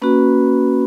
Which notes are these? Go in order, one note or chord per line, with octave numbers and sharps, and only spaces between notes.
A#3 C#4 F#4 B4 B5